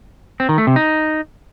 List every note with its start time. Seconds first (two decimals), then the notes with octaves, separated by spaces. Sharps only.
0.40 C4
0.49 D#3
0.58 A3
0.67 C3
0.76 D#4